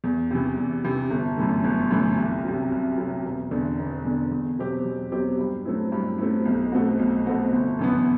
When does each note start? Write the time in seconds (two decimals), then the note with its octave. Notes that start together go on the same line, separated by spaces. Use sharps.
0.04 E2
0.31 C3 E3
0.57 E2
0.84 C3 E3
1.10 G1
1.37 F#2 E3 A3
1.64 G1
1.91 F#2 E3 A3
2.17 C2
2.45 C3 F#3
2.72 C2
2.98 C3 F#3
3.25 E1
3.51 E2 D3
3.78 E1
4.05 E2 D3
4.31 E2
4.59 B2 F#3 C4 G4
4.85 E2
5.12 B2 F#3 C4 G4
5.39 G2
5.65 F#3 A3 C4 E4
5.92 G2
6.18 F#3 A3 C4 E4
6.45 B1
6.72 B2 A3 C4 F#4
6.99 B1
7.26 B2 A3 C4 F#4
7.53 G1
7.79 F#2 E3 B3